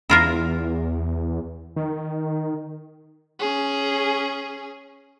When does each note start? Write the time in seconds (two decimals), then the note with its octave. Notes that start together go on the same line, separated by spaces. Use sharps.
0.10 E2 E4 F4 A#4
1.76 D#3
3.39 C#4 G#4